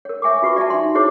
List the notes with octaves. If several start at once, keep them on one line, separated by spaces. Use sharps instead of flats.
A#4 C#5
C#5 E5 G#5 C#6 D6
F4 F#4 B4 C#6
D5 E5 G#5 A5
D#4 C6
E4 F#4 G#4 C5 C#5 D6